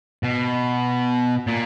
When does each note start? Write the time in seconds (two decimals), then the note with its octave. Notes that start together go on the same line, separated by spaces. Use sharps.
0.23 B2
1.47 A#2